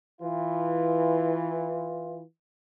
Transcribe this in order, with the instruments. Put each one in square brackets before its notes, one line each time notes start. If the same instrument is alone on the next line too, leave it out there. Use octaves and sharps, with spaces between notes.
[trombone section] E3 F4